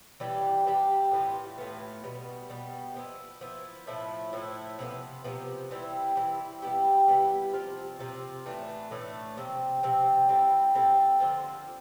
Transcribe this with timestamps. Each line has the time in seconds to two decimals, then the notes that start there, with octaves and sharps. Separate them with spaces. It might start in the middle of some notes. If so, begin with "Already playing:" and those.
0.20 E3 G3 D4 G4
0.66 E3 G3 D4 G4
1.11 A2 E3 B3 F4
1.58 A2 E3 B3 F4
2.04 B2 G3 B3
2.49 B2 G3 B3
2.96 F3 B3 E4
3.41 F3 B3 E4
3.87 A2 F3 A3 E4
4.33 A2 F3 A3 E4
4.79 C3 F3 B3
5.24 C3 F3 B3
5.71 E3 G3 C4 E4
6.16 E3 G3 C4 E4
6.62 G3 B3 E4 G4
7.08 G3 B3 E4 G4
7.53 C3 F3 C4 F4
7.99 C3 F3 C4 F4
8.46 A2 E3 A3 D4
8.91 A2 E3 A3 D4
9.37 C3 F3 C4
9.83 C3 F3 C4
10.29 G3 C4 E4 A4
10.75 G3 C4 E4 A4
11.20 D3 F3 C4 F4